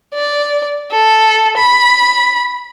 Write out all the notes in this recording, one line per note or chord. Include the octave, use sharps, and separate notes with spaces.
D5
A4
B5